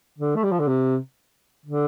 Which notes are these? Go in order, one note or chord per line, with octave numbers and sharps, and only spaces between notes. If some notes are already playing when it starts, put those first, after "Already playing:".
D3
A3
G3
F3
D3
C3
D3